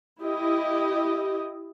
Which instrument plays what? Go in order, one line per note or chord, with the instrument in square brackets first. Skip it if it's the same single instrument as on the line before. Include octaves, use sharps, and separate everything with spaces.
[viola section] E4 G4 D#5